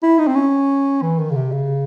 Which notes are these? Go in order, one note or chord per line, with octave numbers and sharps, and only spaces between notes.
E4
D#4
C4
C#4
E3
D#3
C#3
C3
C#3